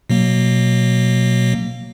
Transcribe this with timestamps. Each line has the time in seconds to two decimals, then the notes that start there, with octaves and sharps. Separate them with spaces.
0.10 B2 F#3 A#3